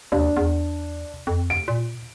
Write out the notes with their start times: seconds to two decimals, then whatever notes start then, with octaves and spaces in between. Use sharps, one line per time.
0.12 D#2 D4
0.37 E2
1.27 F2
1.50 D7
1.68 A#2